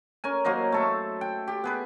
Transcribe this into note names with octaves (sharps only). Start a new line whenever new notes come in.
C#4 A#4 G#5
F#3 A#3 C5 D#5
A3 A4 E5
G5
G4
B3 G#4 B4